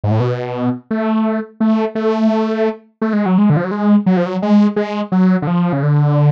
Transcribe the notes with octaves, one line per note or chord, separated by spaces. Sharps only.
G#2
A2
B2
A3
A3
A3
A3
G#3
F#3
G#3
D3
F3
F#3
G#3
F#3
F3
F#3
G#3
G#3
F#3
D3
F3
C#3
D3